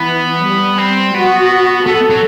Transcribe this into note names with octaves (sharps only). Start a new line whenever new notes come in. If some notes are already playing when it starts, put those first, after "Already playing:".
Already playing: E3 B3
G3
C4
B3 F#4
B3 A4
F#3